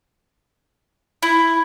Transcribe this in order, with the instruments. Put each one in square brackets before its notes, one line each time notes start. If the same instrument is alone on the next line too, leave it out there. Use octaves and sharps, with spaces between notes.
[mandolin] E4